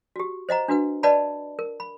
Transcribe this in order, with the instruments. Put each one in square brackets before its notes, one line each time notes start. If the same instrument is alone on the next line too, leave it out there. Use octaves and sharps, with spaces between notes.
[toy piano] F#4 G4
C5 D#5 F#5 A#5
D4 F#4 B4 F#5
B4 D5 D#5 F#5 A5 B5
A#4
B5